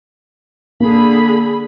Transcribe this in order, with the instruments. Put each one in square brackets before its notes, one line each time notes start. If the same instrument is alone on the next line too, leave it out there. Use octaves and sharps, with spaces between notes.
[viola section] D3 G#4 B5 [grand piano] A#3